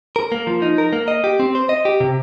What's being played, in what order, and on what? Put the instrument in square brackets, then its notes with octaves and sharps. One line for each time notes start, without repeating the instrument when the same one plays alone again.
[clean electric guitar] A#4
A#3
F3
D#4
A#4
A#3
D#5
G4
C4
C5
D#5
G4
C3